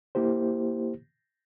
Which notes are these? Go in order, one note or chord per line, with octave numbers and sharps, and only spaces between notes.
A#3 E4 G4 C5